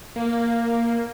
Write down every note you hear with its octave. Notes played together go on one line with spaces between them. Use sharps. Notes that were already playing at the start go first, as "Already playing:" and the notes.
A#3